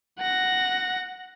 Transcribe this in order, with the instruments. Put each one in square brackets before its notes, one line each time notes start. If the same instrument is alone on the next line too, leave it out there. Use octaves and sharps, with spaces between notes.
[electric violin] F#5 A#6